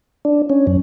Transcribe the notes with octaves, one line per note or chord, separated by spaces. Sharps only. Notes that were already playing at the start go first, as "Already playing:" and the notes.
D4
C#4
F#2